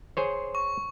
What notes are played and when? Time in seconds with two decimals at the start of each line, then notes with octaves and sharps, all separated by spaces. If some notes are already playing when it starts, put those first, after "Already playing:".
0.17 G#4 C5 C#5
0.55 C#6